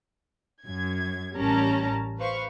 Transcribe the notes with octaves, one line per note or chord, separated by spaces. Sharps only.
F#2 G#6
A1 G3 C#4 A#4 A5 A#5
B4 C5 F5 C#6